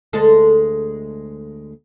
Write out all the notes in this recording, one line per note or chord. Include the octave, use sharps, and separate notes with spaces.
D2 G#3 A4